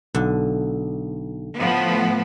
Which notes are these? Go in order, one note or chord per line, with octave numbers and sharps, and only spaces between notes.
B1 D3
A2 F3 B3